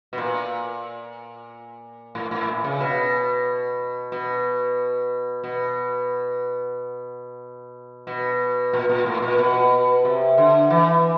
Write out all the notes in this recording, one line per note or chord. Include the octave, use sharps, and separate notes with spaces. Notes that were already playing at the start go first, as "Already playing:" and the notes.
B2
A#2
A2
A2
A#2
C#3
B2
B2
B2
B2
A#2
A#2
A2
A#2
B2
C3
D3
E3